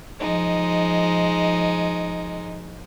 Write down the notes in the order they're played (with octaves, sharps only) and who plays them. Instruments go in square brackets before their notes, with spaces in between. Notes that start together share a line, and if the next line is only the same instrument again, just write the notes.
[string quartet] F3 G#3 D#4